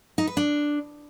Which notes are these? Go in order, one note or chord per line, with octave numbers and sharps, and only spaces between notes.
D#4
B4
D4